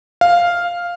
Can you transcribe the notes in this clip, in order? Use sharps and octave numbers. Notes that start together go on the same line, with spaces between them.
F5